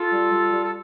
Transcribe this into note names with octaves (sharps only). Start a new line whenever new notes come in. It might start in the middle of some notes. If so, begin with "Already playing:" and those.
Already playing: F4 A4
G3
G3
G3
A4